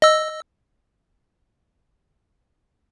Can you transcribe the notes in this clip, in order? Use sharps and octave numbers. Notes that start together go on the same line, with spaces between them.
D#5 E6